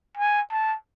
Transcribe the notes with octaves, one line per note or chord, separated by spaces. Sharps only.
G#5
A5